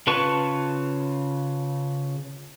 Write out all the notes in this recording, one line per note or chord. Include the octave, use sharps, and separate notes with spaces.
C#3 F4 B4 A5 C#6